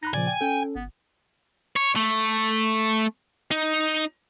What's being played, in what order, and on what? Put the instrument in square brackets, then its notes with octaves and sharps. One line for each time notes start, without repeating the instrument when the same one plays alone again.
[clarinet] D#4 [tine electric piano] B5 F#6 A#6
[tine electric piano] A#2 C#3 F3 [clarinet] D5 [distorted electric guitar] G#5
[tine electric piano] G5
[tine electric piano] C#4 A4 [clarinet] G5
[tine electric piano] G1 [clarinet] B3
[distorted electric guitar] C#5
A3
D#4